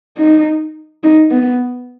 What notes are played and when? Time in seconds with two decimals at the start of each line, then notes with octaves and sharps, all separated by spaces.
0.18 D#4
1.04 D#4
1.31 B3